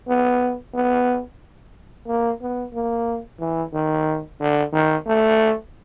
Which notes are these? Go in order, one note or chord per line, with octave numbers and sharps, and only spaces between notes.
B3
B3
A#3
B3
A#3
E3
D#3
D3
D#3
A3